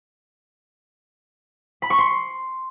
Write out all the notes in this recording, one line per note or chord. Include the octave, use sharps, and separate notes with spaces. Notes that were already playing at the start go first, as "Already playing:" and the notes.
B5
C#6
C6